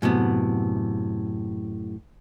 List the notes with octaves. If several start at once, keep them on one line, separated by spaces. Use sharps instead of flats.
F#2 A2 C3 B3